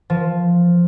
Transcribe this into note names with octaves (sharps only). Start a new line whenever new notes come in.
F3